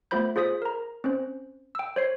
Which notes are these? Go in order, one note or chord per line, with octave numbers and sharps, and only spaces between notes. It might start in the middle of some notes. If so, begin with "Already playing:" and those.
A3 B3 F4 C5 B5 G6
F4 G#4 C5 D#6 B6
A#4 A#5
C4 C#4 C5
G5 E6
C5 C#5 C7